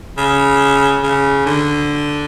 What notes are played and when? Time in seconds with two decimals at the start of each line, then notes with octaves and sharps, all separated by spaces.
0.18 C#3
1.03 C#3
1.46 D3